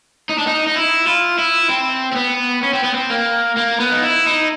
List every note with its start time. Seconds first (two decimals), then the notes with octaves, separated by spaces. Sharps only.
0.29 D#4
0.38 D4
0.47 D#4
0.67 D#4
0.76 E4
1.07 F4
1.38 E4
1.69 C4
2.12 C4
2.16 B3
2.63 C#4
2.73 C4
2.84 B3
2.94 C4
3.10 A#3
3.57 A#3
3.80 B3
3.92 D#4
4.03 E4
4.26 D#4